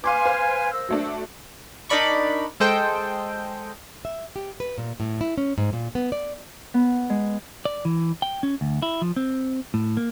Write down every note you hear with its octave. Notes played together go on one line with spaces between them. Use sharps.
B4 F5 G#5 C6 D6
C5 F5
A#4 C5 E6
F#3 A3 D4
D4 D#4 A#4 D5 B5 C#6
G#3 A4 C5 D#5 G5
E5
G4
B4
A#2
A2
E4
C#4
G#2
A#2
B3
D5
B3
G#3
D5
E3
G5
C#4
D2
E4
F3
C4
A2
A#3